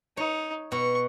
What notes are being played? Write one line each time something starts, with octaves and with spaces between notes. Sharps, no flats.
D#4 C#5
B2 C#6